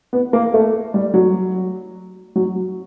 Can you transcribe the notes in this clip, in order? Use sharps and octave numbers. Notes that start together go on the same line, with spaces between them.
B3
A#3
A3
G3
F#3
F#3